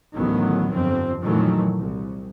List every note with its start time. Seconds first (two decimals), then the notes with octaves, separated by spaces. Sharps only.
0.14 A1 D2 D#3 F#3 B3
0.71 G1 F2 C4
1.22 F2 A#2 D#3 E3 F#3 A3
1.76 C2